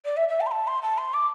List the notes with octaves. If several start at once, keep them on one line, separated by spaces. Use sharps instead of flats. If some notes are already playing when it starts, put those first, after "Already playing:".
D5
E5
E5
A5
C6
A5
C6
A5
C6
D6